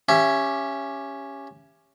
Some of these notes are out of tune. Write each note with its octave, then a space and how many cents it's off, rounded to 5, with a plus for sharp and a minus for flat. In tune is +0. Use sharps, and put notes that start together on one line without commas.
C#4 +0 G4 +10 E5 +30